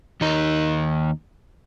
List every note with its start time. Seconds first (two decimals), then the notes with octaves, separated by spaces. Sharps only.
0.21 D#2 D#4